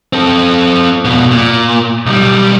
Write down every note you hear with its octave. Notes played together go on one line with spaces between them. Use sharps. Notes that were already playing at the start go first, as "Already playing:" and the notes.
C4 A4
F2 B2
A#2
B1 G3